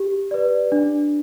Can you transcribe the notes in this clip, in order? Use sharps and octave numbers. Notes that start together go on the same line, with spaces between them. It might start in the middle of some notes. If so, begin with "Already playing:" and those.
Already playing: G4
B4 D5
D4